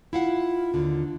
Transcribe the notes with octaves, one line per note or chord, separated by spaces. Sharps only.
E4 F4 F5 F#5
D#2 D3